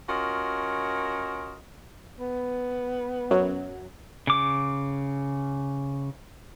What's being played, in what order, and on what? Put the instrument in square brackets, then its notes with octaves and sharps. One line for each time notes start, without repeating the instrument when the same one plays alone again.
[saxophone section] C#4 F4 F#4 A#4 D#5
[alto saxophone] B3
[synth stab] F#2 F#3
[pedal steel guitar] C#3 D6